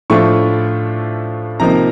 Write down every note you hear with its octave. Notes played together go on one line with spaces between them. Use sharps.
A2 F3 A3 D4 F4 C#6
C3 F3 A#3 D#4 A#5